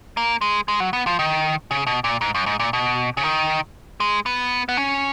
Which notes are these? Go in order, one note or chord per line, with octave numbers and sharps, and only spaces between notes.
A#3
G#3
G#3
F#3
B3
F3
D#3
C#3
B2
A#2
G#2
F#2
G#2
A#2
B2
C#3
D#3
G#3
B3
B3
C#4